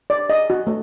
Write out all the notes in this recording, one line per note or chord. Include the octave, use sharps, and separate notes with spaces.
D5
D#5
F#4
A3